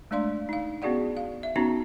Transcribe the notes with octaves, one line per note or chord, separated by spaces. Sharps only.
G#3 A3 D4 D5 F5 C6
D#4 F5
B3 C#4 F#4 G#4 D5 F#5
F5
E5
B3 C#4 D#4 F#4 A#5